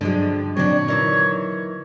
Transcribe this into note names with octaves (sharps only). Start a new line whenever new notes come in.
G2 D3 F3 F#3 G#3
A#2 D3 F#3 C4 D4 C#5
D#3 E3